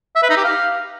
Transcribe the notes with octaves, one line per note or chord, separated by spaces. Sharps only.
E5
B4
D#4
G4
F5